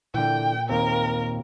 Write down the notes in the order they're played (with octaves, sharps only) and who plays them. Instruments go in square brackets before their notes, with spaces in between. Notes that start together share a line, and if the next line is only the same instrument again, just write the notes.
[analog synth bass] A#2 [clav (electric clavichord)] D3 E3 [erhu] G5
[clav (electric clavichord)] D#2 A#3 C4 [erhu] A#4